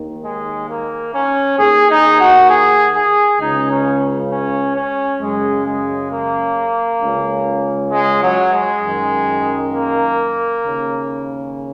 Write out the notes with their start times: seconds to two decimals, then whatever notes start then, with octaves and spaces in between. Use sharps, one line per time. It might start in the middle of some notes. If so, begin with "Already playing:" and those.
Already playing: D#2 D#3
0.24 G#3
0.69 A#3
1.14 C#4
1.59 D#2 D#3 G#4
1.90 D#4
2.20 F#4
2.50 G#4
2.96 G#4
3.40 C#2 C#3 D#4
3.71 C#4
4.31 C#4
4.76 C#4
5.20 F#2 C#3 G#3
5.66 G#3
6.11 A#3
7.02 C#2 C#3
7.92 G#3
8.22 F#3
8.53 G#3
8.82 F#2 D#3
9.73 A#3
10.64 D#2 C#3